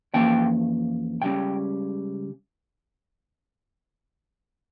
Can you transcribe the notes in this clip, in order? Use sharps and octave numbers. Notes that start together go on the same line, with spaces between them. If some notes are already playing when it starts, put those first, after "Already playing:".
F2 E3 A#3 C#4 G5
C#2 C#3 G3 C#4 G5